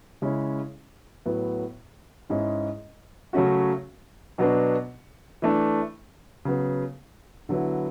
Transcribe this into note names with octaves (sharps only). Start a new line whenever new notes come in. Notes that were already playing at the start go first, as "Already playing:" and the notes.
C#3 G#3 C#4 E4
A2 F#3 B3
G#2 G#3 C#4 E4
C#3 F#3 A3 C#4 F#4
B2 F#3 B3 D4
E3 A3 D4
C#3 F#3 B3
D3 F#3 B3 E4